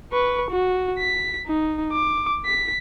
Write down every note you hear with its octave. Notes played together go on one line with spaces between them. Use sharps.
B4 C#6
F#4
B6
D#4
D6
B6